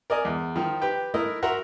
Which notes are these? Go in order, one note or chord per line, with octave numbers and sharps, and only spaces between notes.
A#4 D5 D#5 G#5
E2
D#3 F3
G4 B4 G5
A3 E4 A#4 D#5
F#4 A#4 E5 F#5 A#5 C6